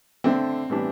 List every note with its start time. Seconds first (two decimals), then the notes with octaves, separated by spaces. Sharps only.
0.24 D3 A3 C4 D4 A4 C5
0.70 A2 E3 G3 B3 D4